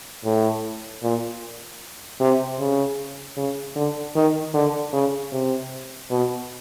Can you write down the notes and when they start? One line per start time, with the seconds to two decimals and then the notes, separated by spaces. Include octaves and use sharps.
0.25 A2
1.03 A#2
2.21 C3
2.59 C#3
3.37 C#3
3.76 D3
4.16 D#3
4.54 D3
4.93 C#3
5.32 C3
6.10 B2